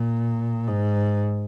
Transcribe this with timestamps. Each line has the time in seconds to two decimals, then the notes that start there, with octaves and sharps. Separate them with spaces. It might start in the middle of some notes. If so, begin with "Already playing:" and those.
Already playing: A#2
0.68 G#2